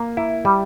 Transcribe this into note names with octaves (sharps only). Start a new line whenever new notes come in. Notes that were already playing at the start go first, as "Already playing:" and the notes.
Already playing: A#3
E4
G3